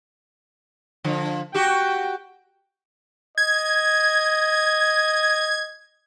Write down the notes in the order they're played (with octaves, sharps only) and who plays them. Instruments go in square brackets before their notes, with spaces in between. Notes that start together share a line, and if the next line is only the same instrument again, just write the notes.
[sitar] D3 F3
[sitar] F#4 G4 [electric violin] G5
[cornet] D#5 [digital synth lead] G#6